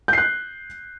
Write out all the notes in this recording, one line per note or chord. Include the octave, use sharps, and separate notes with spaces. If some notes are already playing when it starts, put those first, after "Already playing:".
F#6 G6 C7